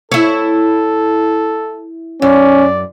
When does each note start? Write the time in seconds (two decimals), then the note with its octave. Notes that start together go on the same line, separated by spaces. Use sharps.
0.12 E4 A4 C#5
2.22 F#2 C#4 D5